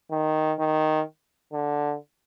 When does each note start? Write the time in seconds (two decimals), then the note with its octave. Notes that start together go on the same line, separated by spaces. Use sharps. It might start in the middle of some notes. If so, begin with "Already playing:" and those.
0.11 D#3
0.59 D#3
1.53 D3